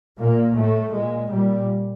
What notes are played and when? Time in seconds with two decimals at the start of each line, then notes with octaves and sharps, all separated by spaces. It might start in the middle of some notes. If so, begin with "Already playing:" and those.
0.18 A#2 A#3
0.56 A2 A3
0.92 A#2 G#3
1.29 A#2 G3